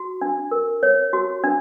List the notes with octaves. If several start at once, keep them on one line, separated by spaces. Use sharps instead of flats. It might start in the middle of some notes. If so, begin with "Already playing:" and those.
Already playing: F#4
D4
A#4
C#5
F#4
D4